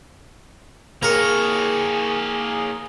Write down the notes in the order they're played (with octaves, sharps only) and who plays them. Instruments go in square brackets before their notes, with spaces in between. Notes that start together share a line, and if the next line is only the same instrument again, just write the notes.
[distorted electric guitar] A#3 C#5 [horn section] G#4 [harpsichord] A#4